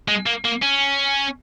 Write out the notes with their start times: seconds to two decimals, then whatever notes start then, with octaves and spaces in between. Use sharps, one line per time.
0.08 G#3
0.26 A#3
0.45 A#3
0.62 C#4